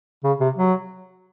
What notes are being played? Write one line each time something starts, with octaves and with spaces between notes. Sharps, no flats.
C#3
C3
F#3